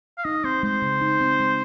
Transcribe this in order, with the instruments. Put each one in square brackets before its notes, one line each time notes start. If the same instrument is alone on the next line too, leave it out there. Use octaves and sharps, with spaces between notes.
[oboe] F5
[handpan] D#4 [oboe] D#5
[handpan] C4 [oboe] C5
[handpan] G#3 [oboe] C5
[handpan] C#3
D#4
C4
G#3